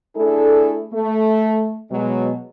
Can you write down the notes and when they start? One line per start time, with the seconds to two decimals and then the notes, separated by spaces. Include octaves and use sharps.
0.16 A3 D4 E4 G#4 A4
0.93 A3
1.91 B2 F#3 G#3